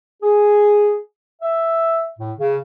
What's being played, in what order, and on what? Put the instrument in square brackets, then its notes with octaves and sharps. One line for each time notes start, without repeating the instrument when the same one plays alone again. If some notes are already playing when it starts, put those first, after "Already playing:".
[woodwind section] G#4
E5
A2
C#3